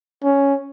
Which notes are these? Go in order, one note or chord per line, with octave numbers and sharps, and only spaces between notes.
C#4